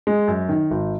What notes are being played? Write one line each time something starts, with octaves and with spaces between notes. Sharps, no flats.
G#3
F#2
D#3
G#1